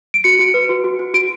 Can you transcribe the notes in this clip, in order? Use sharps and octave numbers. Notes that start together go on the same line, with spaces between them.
D7
F#4 C#7
F#4
B4
F#4
F#4
F#4
F#4 D7